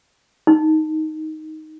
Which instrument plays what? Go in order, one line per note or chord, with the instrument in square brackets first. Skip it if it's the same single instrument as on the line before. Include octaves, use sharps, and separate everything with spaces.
[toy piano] D#4